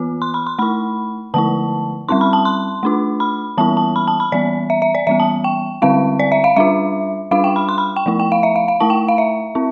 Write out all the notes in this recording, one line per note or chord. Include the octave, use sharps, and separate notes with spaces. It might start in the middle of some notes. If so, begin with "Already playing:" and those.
Already playing: E3 B3 F4
C6
B5
C6
A3 E4 B5
D3 F3 A3 E4 A5
G3 C4 E4 C6
B5
A5
C6
A3 D4 F4
B5
E3 G3 B3 E4 A5
A5
B5
A5
B5
E3 G3 B3 D5
E5
E5
D5
E3 G3 B3 E5
A5
G5
D3 G3 C4 E4 F5
D5
E5
F5
G3 D4 F4 E5
G3 D4 F4 F5
G5
B5
C6
B5
G5
F3 A3 E4
G5
F5
E5
F5
F5
A3 E4 A5
G5
F5
E5
C4 E4